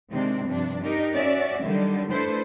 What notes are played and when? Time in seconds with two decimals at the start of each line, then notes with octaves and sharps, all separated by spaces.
0.12 C3 D#3 G#3 C4 D4
0.46 G2 C3 F3 D4
0.83 D4 D#4 G4 A#4
1.14 C#4 F#4 D5 E5
1.64 D3 D#3 F#3 G3
2.11 A3 D4 E4 A4 B4 C5